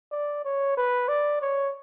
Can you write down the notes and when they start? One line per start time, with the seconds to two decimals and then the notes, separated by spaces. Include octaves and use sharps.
0.12 D5
0.45 C#5
0.77 B4
1.09 D5
1.42 C#5